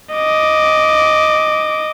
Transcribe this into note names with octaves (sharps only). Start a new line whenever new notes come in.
D#5 D6